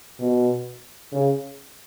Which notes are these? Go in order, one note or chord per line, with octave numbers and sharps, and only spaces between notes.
B2
C#3